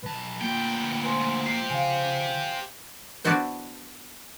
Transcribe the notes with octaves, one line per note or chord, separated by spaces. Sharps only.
B1 B4 A5
D2 A#3 F4 G5
F3 G#5 C6
G4 C5 C7
C#3 F5 G#5
B3 D4 E4 F#4 C5